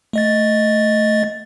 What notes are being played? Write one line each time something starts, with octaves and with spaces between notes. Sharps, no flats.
A3 D#5 A6